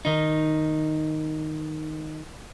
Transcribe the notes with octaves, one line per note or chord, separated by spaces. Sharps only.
D#3 D#4